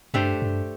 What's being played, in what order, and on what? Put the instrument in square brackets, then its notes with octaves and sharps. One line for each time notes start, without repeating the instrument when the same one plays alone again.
[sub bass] G2 [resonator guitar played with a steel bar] A3 D4 G4 C5
[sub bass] G2